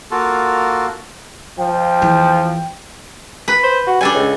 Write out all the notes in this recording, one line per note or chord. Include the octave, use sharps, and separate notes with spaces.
A#3 F4 F#4 A4
F3 G5
E2 E3
B4
C5
F#4
G3 D4 A4 G#5
C#2